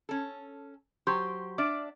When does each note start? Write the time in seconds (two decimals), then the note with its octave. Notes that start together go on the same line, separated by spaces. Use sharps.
0.09 C#4 A4
1.07 F#3 G4 C5 C6 C#6 G6
1.58 D4 D5 E5 D6 F6 D7